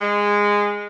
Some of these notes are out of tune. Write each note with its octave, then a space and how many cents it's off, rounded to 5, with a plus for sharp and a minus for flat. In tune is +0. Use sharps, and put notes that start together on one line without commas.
G#3 -15